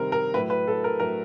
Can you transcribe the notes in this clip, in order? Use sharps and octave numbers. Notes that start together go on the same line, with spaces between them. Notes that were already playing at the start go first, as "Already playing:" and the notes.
Already playing: C3 D#3 G3 A#4 C5
A#4
A2 F#3 B4
B4
A4
A#4
A2 F#3 A#4